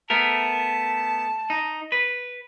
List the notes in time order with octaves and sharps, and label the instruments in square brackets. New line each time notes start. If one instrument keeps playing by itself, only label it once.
[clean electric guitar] A3 B3 A#4 [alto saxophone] A5
[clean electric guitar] D#4
B4